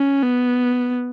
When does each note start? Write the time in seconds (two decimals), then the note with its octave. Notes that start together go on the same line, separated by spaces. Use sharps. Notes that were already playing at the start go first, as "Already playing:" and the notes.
Already playing: C#4
0.23 B3